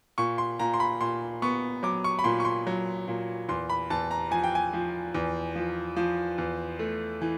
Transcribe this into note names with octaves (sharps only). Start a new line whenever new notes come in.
A#2 C#6
C6
A#2 A#5
C6
B5
A#2 C6
B3 C#6
F#3 D6
C#6
B5
A#2 C6
C#6
C6
F#3
A#2
E2 C6
B5
E2 A5
A#5
F3 G#5
G5
G#5
F3
E2
F3
F3
E2
A3
E3